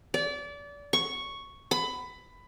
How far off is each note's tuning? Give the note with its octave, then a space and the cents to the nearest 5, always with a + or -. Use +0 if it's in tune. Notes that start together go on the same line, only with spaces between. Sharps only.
D5 -30
C#6 +0
B5 +15